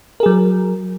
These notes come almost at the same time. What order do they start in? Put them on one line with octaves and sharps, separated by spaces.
A#4 G#4 F#3